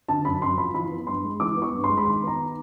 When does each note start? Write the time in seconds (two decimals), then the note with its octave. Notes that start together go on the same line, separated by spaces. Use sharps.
0.08 D3 A5
0.25 F#2 B5
0.42 F#2 C6
0.58 F3 B5
0.74 E3 B5
0.91 B3
1.07 G2 C6
1.24 G#3
1.40 E3 D6
1.57 B3
1.62 C#6
1.73 G2
1.84 C6
1.89 G#3
1.97 B5
2.06 D#3 C6
2.22 B3 A#5